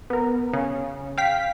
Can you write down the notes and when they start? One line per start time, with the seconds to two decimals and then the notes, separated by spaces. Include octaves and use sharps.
0.10 B3 A#4
0.53 C#3
1.18 F5 G5 B6